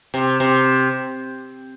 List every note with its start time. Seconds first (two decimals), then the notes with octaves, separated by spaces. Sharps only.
0.14 C3
0.40 C3